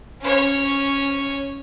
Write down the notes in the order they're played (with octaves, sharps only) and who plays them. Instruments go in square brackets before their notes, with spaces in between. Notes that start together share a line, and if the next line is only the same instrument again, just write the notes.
[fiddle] C#4 C#5